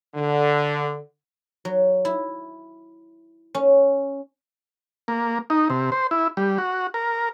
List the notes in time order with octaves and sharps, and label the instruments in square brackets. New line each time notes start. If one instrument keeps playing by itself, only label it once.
[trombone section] D3
[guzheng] F#3
E4
C#4
[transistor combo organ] A#3
D#4
C3
C5
E4
G3
F#4
A#4